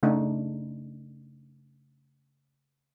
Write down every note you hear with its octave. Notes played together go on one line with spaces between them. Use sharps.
C#3 A3 D4 D#4